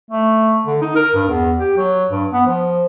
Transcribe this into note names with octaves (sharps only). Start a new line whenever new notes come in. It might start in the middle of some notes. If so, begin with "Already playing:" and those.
A3
D3
D#4
A#4
G2
E2
G4
F#3
G2
B3
F3